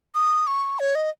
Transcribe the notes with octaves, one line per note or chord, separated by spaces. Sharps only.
D#6
C#6
C#5
D#5